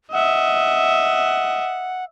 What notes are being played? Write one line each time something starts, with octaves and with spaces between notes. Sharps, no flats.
D#5 E5 F#5